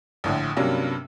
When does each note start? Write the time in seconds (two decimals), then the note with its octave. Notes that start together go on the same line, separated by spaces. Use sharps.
0.24 A#1 A2 D3
0.56 G2 C3 F#3 A#3 C#4 D4